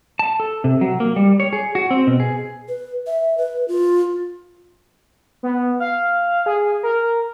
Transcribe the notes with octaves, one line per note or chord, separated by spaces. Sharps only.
A5
A4
C3
F#3
A#3
G3
C#5
G#4
F#4
C4
B2
G#4
B4
E5
B4
F4
B3
F5
G#4
A#4